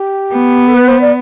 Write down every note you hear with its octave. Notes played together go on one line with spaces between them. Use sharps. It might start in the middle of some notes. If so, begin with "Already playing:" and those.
Already playing: G4
B3
A4
B4
C5
D5